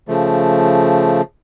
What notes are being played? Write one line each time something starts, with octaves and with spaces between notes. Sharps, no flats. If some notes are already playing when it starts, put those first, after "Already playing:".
C#3 F3 A3